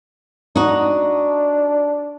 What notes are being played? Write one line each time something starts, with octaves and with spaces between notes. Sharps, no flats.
D4 D#4 F#4